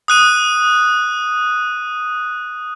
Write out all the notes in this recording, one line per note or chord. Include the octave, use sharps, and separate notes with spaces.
D#6 F#6 D#7